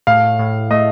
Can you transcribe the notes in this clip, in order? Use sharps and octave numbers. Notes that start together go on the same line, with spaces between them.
A2 F5
A2
A3 D#5